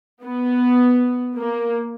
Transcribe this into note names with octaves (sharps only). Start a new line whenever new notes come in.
B3
A#3